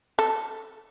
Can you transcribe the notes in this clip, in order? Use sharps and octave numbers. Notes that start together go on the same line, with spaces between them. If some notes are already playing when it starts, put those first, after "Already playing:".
A4